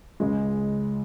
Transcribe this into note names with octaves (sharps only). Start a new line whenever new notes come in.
C#2 C#3 G#3